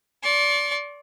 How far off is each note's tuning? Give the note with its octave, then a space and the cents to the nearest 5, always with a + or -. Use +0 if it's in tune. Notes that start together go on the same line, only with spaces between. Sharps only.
D5 -20 C6 +35